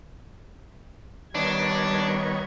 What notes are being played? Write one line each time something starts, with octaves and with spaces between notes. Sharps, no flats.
D#3 G3 B3 D4 C#5 G#6